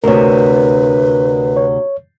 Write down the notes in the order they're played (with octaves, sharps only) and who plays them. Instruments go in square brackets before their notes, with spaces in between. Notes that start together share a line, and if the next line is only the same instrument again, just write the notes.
[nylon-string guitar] D2 C3 [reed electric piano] A#4 C#5 [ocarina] B4
[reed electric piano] C#5